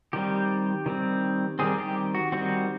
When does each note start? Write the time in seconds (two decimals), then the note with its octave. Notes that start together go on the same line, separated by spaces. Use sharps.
0.13 D#3 G3 C4 G4
0.86 D#3 G3 C4
1.59 D#3 G3 C4 G#4
1.78 G4
2.15 F#4
2.32 D#3 G3 C4 F#4